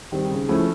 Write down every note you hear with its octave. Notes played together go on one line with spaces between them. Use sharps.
D#3 G3 C4
C#3
F3 A3 C#4 E4